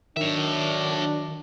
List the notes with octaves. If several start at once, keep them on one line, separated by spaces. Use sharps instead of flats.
D#3 F#3 D4 C#5 E5